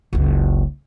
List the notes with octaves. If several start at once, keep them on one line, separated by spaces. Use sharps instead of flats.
F#1 C#2